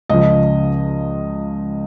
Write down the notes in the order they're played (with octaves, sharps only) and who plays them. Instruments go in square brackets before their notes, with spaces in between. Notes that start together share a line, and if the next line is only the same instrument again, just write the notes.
[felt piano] C#2 C#3 F3 D#5